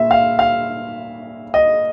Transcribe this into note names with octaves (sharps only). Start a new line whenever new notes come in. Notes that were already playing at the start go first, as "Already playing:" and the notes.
Already playing: A#2 E5
F5
F5
D#5